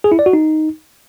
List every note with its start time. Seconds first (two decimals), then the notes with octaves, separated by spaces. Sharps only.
0.04 G#4
0.12 E4
0.19 D5
0.26 F#4
0.33 D#4